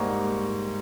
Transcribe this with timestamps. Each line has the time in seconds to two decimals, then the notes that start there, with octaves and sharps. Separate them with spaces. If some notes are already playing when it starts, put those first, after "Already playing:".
Already playing: G#2 G3 A#3 A#5 C#6